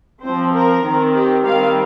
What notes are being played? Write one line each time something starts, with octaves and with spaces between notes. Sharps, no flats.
F3 C4 C5
A#4
D#3 C4
G4
D#3 G3 C4 F5